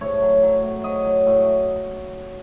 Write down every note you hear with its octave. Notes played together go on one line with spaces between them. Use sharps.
A2 C#5
F#3
F#3
A2
F#3 D#5
F#3
A2